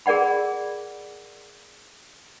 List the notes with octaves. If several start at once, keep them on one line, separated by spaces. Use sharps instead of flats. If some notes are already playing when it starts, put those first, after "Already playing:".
G#4 A#4 D5 F#5 B5